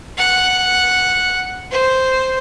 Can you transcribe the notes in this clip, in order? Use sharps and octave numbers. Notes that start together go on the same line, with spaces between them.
F#5
C5